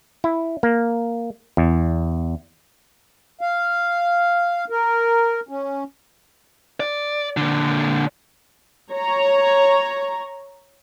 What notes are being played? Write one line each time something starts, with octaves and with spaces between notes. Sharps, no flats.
E4
A#3
E2
F5
A#4
C#4
D5
A#2 D3
C#5 A#5